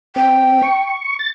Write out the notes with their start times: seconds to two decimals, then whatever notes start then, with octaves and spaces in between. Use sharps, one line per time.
0.16 C4 G5
0.63 C#6
1.19 A6